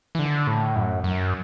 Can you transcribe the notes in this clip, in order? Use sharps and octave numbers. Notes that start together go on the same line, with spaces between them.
E3
D3
A2
F#2
F#2